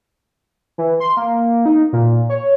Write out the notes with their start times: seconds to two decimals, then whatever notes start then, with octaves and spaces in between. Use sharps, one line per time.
0.78 E3
1.00 C6
1.17 A#3
1.66 D#4
1.93 A#2
2.30 C#5